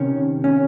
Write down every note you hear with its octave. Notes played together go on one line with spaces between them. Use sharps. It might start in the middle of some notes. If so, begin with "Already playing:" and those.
Already playing: C3 D#3 C#4
C#4